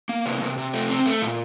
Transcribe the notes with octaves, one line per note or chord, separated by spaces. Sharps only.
A#3
C3
C3
C3
A3
C4
A3
A#2